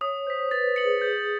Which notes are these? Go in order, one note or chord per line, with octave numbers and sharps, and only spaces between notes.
C#5 D#6
C5 G6 B6
B4 A6
B4
C#7 F#7
G#4
G#4 G6